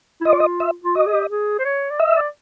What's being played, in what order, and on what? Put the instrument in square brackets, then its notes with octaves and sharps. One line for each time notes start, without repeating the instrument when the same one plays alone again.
[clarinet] E4
[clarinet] F4 [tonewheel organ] D#5
[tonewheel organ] D5
D#5
E5
[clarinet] F4
[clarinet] F#4 [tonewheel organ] D#5
[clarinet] G#4
G4
G#4
C5
C#5
D5
[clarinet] D#5 [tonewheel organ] E5
[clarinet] D5